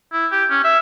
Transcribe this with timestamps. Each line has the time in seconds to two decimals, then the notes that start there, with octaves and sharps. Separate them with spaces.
0.12 E4
0.32 G4
0.50 C#4
0.64 E5